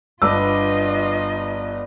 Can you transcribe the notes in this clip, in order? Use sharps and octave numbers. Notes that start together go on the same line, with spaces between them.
G1 D4 F4 B4 D5 D#5 E6